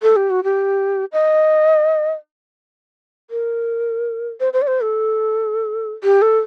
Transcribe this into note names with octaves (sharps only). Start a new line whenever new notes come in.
A4
G4
F#4
G4
D#5
A#4
C5
C5
D5
C5
A4
G4
A4